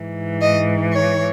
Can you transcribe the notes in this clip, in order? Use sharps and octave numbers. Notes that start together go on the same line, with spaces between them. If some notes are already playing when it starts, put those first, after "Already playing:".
Already playing: G#2 E3
D#5
C#5